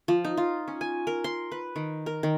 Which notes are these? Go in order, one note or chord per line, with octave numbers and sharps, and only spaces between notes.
F3
D#4
F4
C#4
G#5
A#4
C6
B4
D#3
A#4
D#3